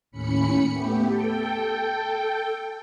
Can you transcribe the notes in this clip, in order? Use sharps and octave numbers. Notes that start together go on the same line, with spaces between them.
D#2 A2 C#4 B5 C#7
A3 B3 G4
A4 G5